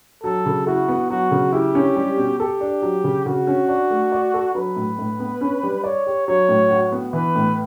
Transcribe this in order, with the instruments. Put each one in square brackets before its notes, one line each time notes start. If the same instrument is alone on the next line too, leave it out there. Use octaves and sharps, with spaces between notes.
[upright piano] F#3 [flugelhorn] A4
[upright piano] C#3
[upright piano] E4 [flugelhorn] F#4
[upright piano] B3
[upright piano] F#3 [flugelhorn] F#4
[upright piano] C#3
[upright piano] E4 [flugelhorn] G4
[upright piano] C#4
G3
B2
[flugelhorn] G4 [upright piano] A4
[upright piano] D4
F#3
C#3
[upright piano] C#3 [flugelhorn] F#4
[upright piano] C#4
D4
A3
D5
A4
[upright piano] F#3 [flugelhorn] B4
[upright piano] A2
A2
B3
C#4
G3
[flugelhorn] C#5 [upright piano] D5
[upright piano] G4
[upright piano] F#3 [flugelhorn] C#5
[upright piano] A2
F#4
B3
[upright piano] E3 [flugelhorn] B4
[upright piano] A2